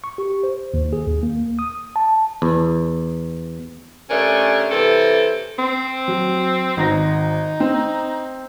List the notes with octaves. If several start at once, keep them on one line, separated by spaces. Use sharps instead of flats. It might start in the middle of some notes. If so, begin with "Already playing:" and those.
C#6
G4
C5
D#2
G#4
D#2
A#3
D#6
A5
E2
C3 A3 C#4 D4 A#4
C3 E3 C4 A4
C4
F#3
G#1 D#4 A#6
C4